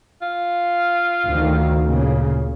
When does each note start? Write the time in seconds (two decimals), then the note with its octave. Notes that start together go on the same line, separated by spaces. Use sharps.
0.22 F4
1.29 D2 D#3
1.85 A#2 C#3 A#3